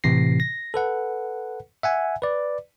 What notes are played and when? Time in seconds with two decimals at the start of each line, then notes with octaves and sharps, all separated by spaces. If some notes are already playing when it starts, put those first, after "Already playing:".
0.04 A2 C3 E3 A#6 C7
0.40 A#6
0.74 A4 B4 F#5
1.83 E5 F#5 G#5
2.22 B4 D5